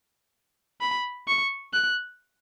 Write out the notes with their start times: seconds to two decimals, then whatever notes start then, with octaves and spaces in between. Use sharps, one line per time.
0.81 B5
1.28 C#6
1.74 F#6